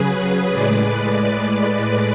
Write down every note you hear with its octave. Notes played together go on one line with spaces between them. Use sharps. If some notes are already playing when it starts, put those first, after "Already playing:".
Already playing: C#3 F#3 G#4 B4
A2 G#3 B4 D5
B4 D5